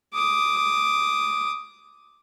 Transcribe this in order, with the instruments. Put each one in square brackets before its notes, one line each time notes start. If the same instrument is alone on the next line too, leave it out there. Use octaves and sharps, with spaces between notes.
[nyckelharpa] D6 D#6